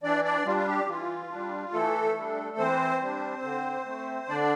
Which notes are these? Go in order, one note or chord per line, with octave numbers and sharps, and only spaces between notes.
E3 D4 D5
D4 D5
G3 D4 F4
F4
G4
E3 F4
G3 D4
E3 A3 A4
G3 D4
E3 C4 C5
G3 D4
D3
A3 C4
D3 D4 D5